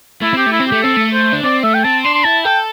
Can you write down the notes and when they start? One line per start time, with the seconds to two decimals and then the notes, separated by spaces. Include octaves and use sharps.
0.21 A3 E4
0.34 C4 G4
0.46 A3
0.52 E4
0.60 C4
0.68 A3 G4
0.83 C4 A4
0.97 A3
1.13 C5
1.33 D4
1.43 C4 D5
1.63 A3 E5
1.74 G5
1.84 C4 A5
2.04 D4 C6
2.14 C6
2.24 E4 A5
2.44 A4 G5